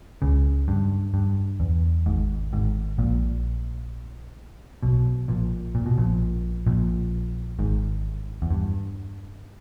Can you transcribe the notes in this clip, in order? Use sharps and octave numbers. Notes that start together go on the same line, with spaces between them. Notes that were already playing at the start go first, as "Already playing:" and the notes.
C#2 C#3
G2
G2
E2
G#1 G#2
G#1 G#2
A#1 A#2
B1 B2
A#1 A#2
A#2
B2
A#1 A#2
A#1 A#2
G#1 G#2
E2
G2